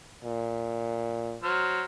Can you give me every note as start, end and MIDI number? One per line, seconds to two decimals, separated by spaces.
0.24 1.37 46
1.43 1.84 54
1.43 1.84 72
1.43 1.84 89